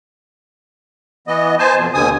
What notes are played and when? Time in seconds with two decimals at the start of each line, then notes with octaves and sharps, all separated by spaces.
1.28 E3 B3 D#5
1.59 C5 G#5 A5
1.77 F2 B2
1.94 D#2 B2 D3 G#5 D#6